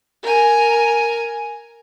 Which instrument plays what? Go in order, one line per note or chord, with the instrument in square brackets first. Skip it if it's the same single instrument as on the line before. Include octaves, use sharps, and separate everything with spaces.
[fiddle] A#4 G#5